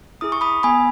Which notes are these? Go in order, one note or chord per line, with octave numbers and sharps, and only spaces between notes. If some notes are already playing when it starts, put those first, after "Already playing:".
E4 G#4 D#6
C#6
B5 D#6
B3 G#5 B5